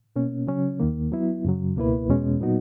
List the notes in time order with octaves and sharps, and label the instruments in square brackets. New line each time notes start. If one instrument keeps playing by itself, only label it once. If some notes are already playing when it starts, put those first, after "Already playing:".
[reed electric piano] B2 A#3 C#4
C#3 F#3 C#4
D#2 D#3 A#3
F#3 B3 E4
F#2 C#3 F#3
C#2 B2 A#3 E4 B4
E2 B2 G#3 C#4
A#2 F#3 B3 D#4 F#4